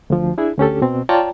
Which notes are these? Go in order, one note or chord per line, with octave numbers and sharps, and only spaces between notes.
D2 F3
D4 E4 G#4
D2 C#4 G4 A4
B2 C4
F4 C#5 D5 G5 A5 A#5